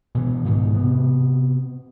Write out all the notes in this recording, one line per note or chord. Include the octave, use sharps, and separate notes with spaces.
B2 E3
G#2 B2 D#3 E3
C3 B3